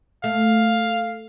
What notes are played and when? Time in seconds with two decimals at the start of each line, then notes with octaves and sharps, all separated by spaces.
0.24 A3 F5